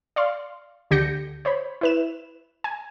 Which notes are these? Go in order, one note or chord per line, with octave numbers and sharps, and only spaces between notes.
D5 F5 C6
D2 D3 G4 G6 A#6 C#7
C5 C#5 B5
E4 B4 E7
G#5